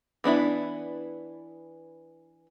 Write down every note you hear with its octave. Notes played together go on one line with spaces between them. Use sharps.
E3 B3 D4 E4